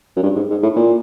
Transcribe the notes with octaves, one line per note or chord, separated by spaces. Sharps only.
F#2
G2
G#2
G#2
A2
A#2